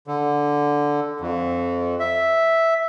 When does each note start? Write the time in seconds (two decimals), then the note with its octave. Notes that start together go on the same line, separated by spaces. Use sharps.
0.07 D3
1.20 F2
2.00 E5